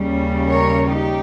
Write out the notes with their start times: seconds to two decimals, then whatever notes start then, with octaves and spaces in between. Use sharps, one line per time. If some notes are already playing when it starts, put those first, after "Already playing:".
Already playing: D#2 C#3 G3 C#4
0.49 A#4 C#5
0.90 D#4 G4